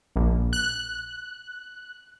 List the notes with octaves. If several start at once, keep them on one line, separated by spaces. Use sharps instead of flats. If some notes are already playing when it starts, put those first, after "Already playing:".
A#1
F#6